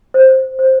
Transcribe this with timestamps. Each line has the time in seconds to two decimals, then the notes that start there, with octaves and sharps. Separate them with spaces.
0.14 C5
0.59 C5